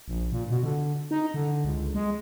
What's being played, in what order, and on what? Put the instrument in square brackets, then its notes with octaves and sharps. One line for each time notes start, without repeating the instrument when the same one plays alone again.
[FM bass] A#1
A#2
B2
D3
D#4
D3
C#2
G#3